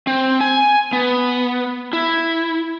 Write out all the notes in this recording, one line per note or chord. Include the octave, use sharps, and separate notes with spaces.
C4
G#5
B3
E4